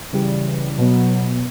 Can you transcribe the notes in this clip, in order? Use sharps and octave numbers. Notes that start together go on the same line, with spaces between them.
C#3 E3 G3
B2 F#3 B3